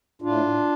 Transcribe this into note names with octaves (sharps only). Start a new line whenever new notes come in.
A2 D4 F4